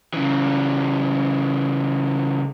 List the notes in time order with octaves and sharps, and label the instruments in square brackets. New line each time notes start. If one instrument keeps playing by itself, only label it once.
[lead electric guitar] C#3 E3